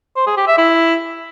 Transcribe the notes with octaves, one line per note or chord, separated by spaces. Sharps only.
C5
G#4
G4
E5
E4